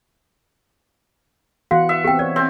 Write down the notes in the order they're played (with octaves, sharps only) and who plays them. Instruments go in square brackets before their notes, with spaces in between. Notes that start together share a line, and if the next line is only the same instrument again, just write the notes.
[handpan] E3 B3 F#5 [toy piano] F#4 F5
[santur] E5
[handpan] B3 C4 [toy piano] G4 G5
[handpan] C#5 [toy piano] D5
[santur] C4